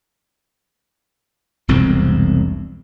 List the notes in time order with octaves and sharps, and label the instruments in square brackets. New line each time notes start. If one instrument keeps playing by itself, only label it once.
[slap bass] E1 C2 F2 C4